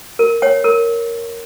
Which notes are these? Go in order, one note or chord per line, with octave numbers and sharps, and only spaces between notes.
A#4
C#5 G5
A#4